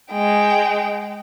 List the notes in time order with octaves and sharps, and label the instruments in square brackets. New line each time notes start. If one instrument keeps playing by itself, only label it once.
[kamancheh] G#3 G5